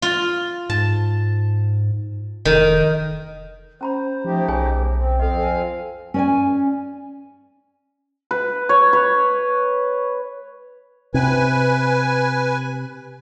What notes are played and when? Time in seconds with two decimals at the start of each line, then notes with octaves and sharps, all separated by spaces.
0.02 F4
0.70 G#2 A5
2.45 F1 D#3
3.81 C#4 C5 A#5 B5
4.24 F3 A3 D#4 G4
4.48 B1 G#4 C#5 G#5
4.96 C4
5.20 F2 C4 A4 D#5 F5
5.39 G#5
6.14 C#4 D5 G#5
8.31 B4
8.69 C#5
8.93 B4
11.14 C3 B4 G#5